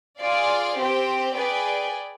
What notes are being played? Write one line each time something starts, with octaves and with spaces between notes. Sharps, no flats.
F4 G#4 D5 F5
C4 G4 C5 G5
G#4 B4 D5 G5